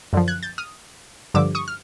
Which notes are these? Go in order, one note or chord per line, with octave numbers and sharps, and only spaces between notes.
F#2 D3 F3
F#6 G#6
G6 A6
D#6 F6
G2 D3 F3 D6 E6
C#6 D#6
F6